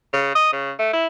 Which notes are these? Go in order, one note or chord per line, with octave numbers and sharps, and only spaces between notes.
C#3
D#5
C#3
A3
E4